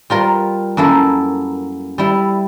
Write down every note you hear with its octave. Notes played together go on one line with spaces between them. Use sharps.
G3 F4 A#4
F#2 A#3 E4 A4
G3 E4